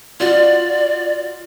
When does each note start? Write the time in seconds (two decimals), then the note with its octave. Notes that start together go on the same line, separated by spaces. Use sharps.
0.20 F4 F#4 D5